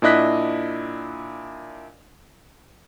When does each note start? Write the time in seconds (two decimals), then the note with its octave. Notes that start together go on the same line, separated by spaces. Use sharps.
0.02 A#2 D4 E4 D#5 F#6 B6